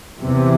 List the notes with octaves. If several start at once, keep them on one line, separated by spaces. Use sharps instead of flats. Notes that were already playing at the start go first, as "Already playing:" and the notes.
E2 C3 E3